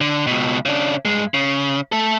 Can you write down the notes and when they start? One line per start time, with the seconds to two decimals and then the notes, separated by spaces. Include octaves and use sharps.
0.01 D3
0.27 C#2 B2
0.66 C#3 D4
1.05 G2 G#3
1.34 C#3
1.92 A3 A4